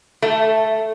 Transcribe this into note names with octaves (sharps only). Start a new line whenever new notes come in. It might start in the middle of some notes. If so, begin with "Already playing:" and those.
A3